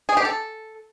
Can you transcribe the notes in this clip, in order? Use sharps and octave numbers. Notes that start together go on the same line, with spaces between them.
G#4
G4
A4